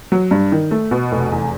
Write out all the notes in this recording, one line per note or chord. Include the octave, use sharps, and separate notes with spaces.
F#3
G2
D#3
A3
B2
F1
E2